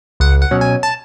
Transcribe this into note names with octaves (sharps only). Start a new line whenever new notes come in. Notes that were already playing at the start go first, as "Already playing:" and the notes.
C#2 F#5
F#5
B2 F#3 C#4
G#5
A5